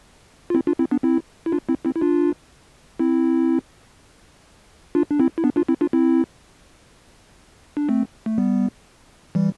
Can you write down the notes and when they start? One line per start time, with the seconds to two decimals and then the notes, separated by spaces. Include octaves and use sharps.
0.50 F4
0.55 C4 E4
0.67 D4 F4
0.79 C4 E4
0.91 B3 D4
1.03 C4 E4
1.46 E4
1.52 D4 F4
1.69 C4 E4
1.85 C4 E4
1.96 E4
2.01 D4 F4
2.99 C4 E4
4.95 D4 F4
5.11 D4
5.20 C4 E4
5.38 E4
5.44 B3 D4
5.56 D4 F4
5.69 C4 E4
5.81 D4 F4
5.93 C4 E4
7.77 D4
7.89 A3 C4
8.26 A3
8.38 G3 B3
9.35 E3 G3